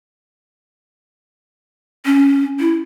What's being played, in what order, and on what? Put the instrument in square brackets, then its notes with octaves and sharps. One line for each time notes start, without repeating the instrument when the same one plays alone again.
[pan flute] C#4
E4